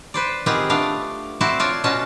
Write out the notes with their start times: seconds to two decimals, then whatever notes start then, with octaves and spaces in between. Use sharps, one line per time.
0.14 B4 C5 D5
0.46 D#3 B3 C4 F4 G4 G#4
0.70 A3 B3 D4 D5 F5
1.41 C4 E4 F#4 C5 D5 A5
1.60 F4 F#4 A4 C#5 D5
1.84 B2 C#4 F4 F#4 A5